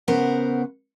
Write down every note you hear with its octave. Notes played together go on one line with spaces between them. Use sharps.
C#3 B3 A#4 C5 F#5